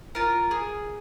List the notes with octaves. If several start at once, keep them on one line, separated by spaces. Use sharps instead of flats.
F4 A#4
G#4